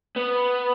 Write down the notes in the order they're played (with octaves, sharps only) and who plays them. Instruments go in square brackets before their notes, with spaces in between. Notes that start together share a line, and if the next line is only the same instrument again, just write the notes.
[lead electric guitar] B3